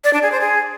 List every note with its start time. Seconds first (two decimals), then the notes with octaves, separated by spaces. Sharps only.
0.04 D5
0.13 D4
0.23 G#4
0.32 C5
0.41 G#4